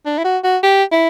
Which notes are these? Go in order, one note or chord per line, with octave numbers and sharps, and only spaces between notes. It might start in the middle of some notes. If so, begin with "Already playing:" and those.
D4
E4
F#4
F#4
G4
E4